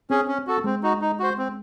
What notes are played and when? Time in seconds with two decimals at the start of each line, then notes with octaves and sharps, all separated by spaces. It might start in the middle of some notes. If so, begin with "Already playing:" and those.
0.10 C4 C#4 G#4
0.28 C#4
0.47 F#4 A4
0.64 G#3 C4
0.83 D#4 F#4
1.01 D#4
1.20 F#4 C5
1.38 C4